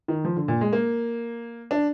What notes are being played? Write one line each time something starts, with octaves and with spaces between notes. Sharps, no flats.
D#3
F3
D3
A#2
G#3
A#3
D4